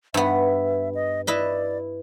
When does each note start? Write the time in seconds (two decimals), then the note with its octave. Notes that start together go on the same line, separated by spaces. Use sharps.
0.14 G2 B3 E5
0.95 D#5
1.27 E4 B4 D5 D#5